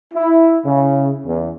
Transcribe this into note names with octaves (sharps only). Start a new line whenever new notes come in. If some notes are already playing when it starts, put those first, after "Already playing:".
E4
C#3
E2